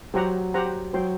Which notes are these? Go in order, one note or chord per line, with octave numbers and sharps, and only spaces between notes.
F#3 G4 C5 F#5 A#5
G4 C5 F#5 A#5
F#3 C5 G5 C6